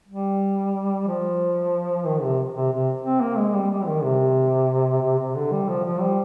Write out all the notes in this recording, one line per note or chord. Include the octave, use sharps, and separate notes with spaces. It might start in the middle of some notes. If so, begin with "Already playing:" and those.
G3
F3
D#3
C3
C3
C3
C4
A#3
G#3
G3
G3
D#3
C3
C3
C3
D3
G3
F3
F3
G3